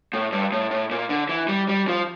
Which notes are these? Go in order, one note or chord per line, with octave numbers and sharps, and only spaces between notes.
A2
G2
A2
A2
A#2
D3
E3
G3
G3
F3